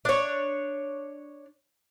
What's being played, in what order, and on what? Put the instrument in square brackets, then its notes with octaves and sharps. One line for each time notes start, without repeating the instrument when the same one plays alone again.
[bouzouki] D4 C#5